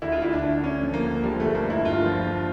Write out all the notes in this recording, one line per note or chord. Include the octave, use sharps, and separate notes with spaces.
D2 E4
F4
D2 E4
D4
D2
D3 C#4
F3
A#3
D2
F3 G3
G1 A3
A#3
G2
E4
G1 F4
F3
G2